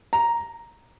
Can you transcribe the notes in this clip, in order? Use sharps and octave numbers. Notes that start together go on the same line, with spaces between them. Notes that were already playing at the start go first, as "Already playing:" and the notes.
A#5